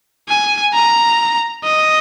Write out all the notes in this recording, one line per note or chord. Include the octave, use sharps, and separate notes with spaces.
G#5
A#5
D#5